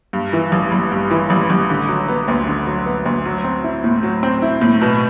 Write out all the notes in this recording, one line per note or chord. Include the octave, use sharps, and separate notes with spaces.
G2
E3
A1
A1
G2
E3
A1
A1
D3
F#3
B3
D2
D3
F#3
B3
D2
F#3
C4
E4
A2
F#3
C4
E4
A2
B2